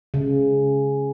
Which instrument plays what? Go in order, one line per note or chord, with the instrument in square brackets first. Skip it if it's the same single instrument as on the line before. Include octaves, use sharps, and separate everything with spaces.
[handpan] C#3